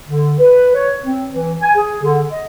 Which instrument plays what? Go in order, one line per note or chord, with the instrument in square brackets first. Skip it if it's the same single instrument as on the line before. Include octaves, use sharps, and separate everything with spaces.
[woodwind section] D3
B4
C#5
C4
E3
G#5
G#4
D3
D#5